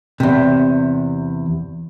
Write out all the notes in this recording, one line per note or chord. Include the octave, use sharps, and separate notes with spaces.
E2 C3